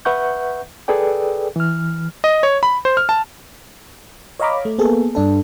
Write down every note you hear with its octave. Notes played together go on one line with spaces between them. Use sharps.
B4 E5 F#5 C#6 G6
G#4 A4 B4 D5 G5
E3 F6
D#5
C#5
B5
C5
F6
A5
C#5 D#5 F5 A#5 B5 D6
A3
A#3 B3 G#4 A4
G2 D4 A4